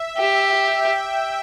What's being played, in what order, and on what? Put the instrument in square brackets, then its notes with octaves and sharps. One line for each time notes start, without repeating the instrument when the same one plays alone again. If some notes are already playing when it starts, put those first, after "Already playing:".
Already playing: [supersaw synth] E5
[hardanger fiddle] G4
[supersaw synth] G5